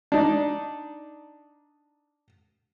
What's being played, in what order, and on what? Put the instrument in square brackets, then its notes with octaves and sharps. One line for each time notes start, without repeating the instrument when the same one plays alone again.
[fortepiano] D4 D#4